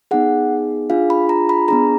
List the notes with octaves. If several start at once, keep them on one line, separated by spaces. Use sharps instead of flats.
B3 D#4 G#4 F#5
D4 F4 G#4 F5
B5
A#5
B5
B3 D4 G#4 A#5